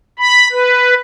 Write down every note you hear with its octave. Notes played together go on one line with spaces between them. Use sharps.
B5
B4